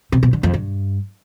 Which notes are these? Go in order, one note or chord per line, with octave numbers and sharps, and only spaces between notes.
C3
B2
D3
F2
G2